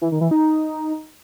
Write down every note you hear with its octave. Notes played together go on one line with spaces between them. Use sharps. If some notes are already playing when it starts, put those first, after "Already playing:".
E3
D#3
E3
D#4